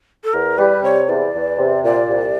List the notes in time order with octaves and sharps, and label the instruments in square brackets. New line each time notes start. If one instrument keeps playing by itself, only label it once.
[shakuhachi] A4
[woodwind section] E2 [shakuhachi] A#4
[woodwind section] G3 [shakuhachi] B4
[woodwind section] C3 [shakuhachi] C#5
[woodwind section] E2 [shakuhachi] D5
[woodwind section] E2
C3
[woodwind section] A#2 [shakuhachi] D5
[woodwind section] C2